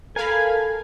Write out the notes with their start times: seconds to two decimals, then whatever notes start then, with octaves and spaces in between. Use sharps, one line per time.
0.16 A4 A#4 F5 G#5 B5